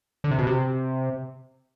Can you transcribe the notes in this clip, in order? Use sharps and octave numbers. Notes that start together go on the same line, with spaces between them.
D3
C3
B2
C3